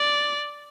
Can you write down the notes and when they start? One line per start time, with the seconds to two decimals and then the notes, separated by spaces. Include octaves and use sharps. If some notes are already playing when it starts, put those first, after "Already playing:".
Already playing: D5